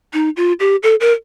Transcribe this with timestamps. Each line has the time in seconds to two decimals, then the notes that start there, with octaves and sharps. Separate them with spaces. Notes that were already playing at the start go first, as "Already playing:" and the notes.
0.13 D#4
0.37 F4
0.60 G4
0.83 A4
1.00 A#4